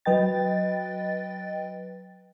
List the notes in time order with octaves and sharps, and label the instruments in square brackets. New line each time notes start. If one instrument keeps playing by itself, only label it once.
[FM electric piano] F#3 B4 D#5 G5 A6